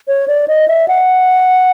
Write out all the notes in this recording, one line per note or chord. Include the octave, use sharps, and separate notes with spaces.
C#5
D5
D#5
E5
F#5